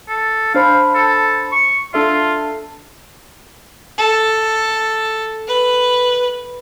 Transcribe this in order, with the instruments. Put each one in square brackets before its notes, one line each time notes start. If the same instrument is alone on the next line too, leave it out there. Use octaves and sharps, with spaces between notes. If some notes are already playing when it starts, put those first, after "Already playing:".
[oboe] A4
[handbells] D4 C5 B5 [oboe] F5
[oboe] A4
C#6
[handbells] D4 A4 E5 [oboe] F4
[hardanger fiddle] A4
B4